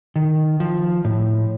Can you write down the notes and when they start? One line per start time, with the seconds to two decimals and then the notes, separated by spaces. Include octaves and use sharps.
0.16 D#3
0.60 F3
1.05 A2